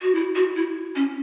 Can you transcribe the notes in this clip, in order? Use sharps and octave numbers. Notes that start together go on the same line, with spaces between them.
F#4
E4
F#4
E4
C#4